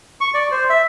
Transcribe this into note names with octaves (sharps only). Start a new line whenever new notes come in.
C#6
D5
C5
E5